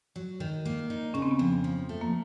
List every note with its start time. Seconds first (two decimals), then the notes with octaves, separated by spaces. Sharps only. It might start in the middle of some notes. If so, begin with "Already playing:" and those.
0.16 F#3
0.40 D#3
0.65 A#3
0.90 D#4
1.14 C#3 C#4
1.22 C4
1.31 B3
1.39 F2 C4
1.64 F3
1.89 A3
2.01 A#3